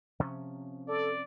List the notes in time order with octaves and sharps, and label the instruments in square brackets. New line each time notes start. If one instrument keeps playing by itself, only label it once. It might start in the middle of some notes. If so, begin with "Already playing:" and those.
[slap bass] C3 F3 C#4
[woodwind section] A4 [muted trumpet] D5